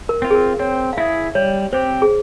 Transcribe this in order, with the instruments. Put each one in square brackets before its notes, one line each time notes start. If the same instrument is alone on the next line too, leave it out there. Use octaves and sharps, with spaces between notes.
[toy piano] A#4
[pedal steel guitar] C4 F4
[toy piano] G#4
A#4
[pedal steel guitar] C4 [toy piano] C#5
[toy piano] F5
[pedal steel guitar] E4 G#4 [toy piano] E5
[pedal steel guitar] G3 [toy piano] C#5
[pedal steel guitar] C4 G4 [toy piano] C5
[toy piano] G#4